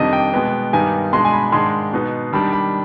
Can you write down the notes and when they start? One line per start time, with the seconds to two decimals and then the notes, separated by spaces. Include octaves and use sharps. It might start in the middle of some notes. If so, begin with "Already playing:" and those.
Already playing: F2 C3 D#3 G3 D4 D#5
0.13 G5
0.33 B2 G#3 B3
0.73 G2 D#3 G3 B3 D#4 G#5
1.13 B2 G#3 D4 C6
1.25 G#5
1.33 B5
1.52 G#2 D#3 G#3 D4 C6
1.93 B2 B3 D#4
2.33 D#3 G3 D4 B5
2.53 B5